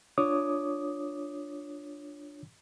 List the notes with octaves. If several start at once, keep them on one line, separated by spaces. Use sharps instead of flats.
D4 F4 C#5 D6 D#6